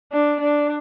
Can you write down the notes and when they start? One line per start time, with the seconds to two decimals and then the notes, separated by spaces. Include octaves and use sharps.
0.12 D4
0.40 D4